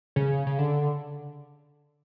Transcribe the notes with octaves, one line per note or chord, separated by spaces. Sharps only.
C#3
C#3
D3